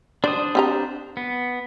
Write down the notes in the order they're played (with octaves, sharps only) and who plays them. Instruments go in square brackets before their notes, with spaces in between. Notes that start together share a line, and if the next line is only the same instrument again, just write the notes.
[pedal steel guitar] D4 C5 D#6 [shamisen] D5
[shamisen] C4 G4 A#5
[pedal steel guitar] B3